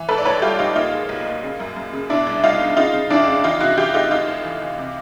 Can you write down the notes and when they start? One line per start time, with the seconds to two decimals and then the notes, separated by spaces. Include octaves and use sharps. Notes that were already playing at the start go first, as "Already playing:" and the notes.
Already playing: E3
0.09 G#2 A4 B4
0.18 D5
0.25 A#1 B4 C#5
0.42 G3 F4 G4
0.59 A#1 D#4 F4
0.76 A#2 D#4 F4
0.93 G#3
1.09 B1
1.26 A#2
1.43 C#3
1.60 F#2
1.76 F#2
1.93 C#3
2.09 B2 D4 E4
2.27 C2
2.43 C2 D#4 F4
2.60 C2
2.77 C#3 D#4 F4
2.94 C#3
3.10 F2 D4 E4
3.27 C#3
3.44 E3 D#4 F4
3.60 C3 E4 F#4
3.77 E3 F4 G4
3.94 A3 D#4 F4
4.11 A1 D#4 F4
4.28 A1
4.45 E3
4.62 E3
4.78 C3